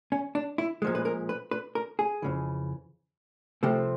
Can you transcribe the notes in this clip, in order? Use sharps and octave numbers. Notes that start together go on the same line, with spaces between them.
C#4
D4
E4
A#2 F3 G#3
B4
A#4
B4
B4
A#4
G#4
F2 C#3 E3
C2 C3 F3 A3 C4 G4